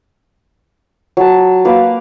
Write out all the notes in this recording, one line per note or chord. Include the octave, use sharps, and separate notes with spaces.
F#3 A5
A#3 A#4 B4 F5